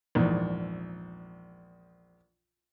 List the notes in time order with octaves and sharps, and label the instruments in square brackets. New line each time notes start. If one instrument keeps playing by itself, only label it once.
[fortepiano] A#1 E2 G#2